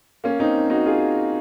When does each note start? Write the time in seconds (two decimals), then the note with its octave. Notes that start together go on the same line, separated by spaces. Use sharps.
0.24 A#3 C#4
0.39 C4 D#4
0.70 D#4 F#4
0.86 F4 G#4